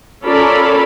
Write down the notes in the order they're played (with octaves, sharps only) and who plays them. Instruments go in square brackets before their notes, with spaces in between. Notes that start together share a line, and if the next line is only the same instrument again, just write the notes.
[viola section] C#4 F4 A4 A#4 D5 B5